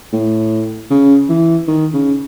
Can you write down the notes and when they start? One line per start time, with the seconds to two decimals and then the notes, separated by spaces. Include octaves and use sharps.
0.13 A2
0.90 C#3
1.29 E3
1.68 D#3
1.94 C#3